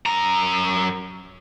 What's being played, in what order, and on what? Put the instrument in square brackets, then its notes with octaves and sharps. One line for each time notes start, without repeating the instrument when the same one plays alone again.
[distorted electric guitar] F#2 A#5